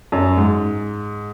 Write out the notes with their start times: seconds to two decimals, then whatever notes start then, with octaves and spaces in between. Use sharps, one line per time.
0.12 F#2
0.37 G#2